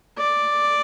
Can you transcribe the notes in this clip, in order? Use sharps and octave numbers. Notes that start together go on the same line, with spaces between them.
D5